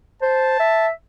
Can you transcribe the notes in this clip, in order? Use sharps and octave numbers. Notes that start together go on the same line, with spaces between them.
C5 A5
E5